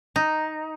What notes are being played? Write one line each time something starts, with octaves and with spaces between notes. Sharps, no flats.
D#4